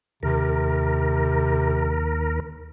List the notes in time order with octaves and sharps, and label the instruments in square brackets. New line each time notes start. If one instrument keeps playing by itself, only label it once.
[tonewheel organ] D#2 A#4 [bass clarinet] C3